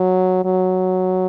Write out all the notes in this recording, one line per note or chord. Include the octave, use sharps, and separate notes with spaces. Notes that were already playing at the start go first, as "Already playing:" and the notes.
Already playing: F#3
F#3